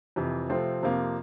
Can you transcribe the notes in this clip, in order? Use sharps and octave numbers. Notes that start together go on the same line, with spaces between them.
F2 C3 E3
C3 F3 A3 C4
F2 C3 F3 A#3